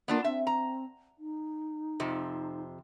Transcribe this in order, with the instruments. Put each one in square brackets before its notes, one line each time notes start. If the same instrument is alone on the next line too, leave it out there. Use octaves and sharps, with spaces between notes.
[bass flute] A#3 [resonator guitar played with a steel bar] B3 D4 F4
[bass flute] C4 [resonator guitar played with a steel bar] E5
[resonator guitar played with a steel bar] A#5
[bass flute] D#4
[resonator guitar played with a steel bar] F2 C3 F3